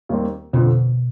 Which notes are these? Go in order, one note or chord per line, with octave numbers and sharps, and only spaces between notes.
D#2 D#3 G3 C4
F2 B2 D3 F3